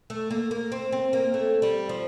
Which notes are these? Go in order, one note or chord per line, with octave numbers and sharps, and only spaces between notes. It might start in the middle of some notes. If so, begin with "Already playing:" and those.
A3
A#3
A#3
C4
C4
A#3
A3
G3
F3